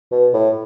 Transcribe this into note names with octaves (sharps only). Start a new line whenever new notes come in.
B2
A2